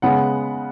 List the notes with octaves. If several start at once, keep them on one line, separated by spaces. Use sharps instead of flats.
C#3 G#3 B3 F#5